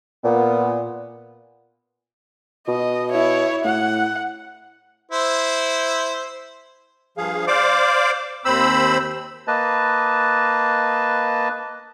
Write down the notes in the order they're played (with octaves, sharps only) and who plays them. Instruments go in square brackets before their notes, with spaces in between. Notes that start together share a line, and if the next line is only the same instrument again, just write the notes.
[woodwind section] A#2 [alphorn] B3
[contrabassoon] B2 [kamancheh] D#5
[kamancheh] E4 C#5
[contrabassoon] A2 [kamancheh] F#5
[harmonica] E4 C5
[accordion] G2 F3 G#4 F5
C5 D5 F5 D6
D#2 C4 C5 B5 E6
[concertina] A#3 B4 D#5 A5